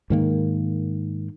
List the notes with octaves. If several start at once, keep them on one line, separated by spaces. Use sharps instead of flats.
G#2 D#3 A#3